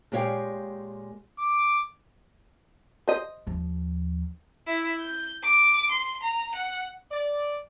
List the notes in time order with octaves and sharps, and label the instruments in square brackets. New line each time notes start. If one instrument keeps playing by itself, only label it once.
[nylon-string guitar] A#2 G#3 G4 C#5 F5 G5
[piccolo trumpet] D6
[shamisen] C5 D#5
[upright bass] D#2 F3
[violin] E4
G6
D6
C6
A#5
F#5
[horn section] D5